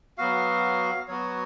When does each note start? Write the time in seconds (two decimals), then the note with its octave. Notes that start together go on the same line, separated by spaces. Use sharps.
0.18 F#3 B3 F#4 F5
1.08 F#3 B3 F#4 C#5